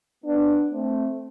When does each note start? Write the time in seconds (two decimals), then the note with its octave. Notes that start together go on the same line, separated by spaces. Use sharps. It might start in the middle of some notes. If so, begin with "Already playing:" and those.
0.25 B3 D4
0.71 A3 C4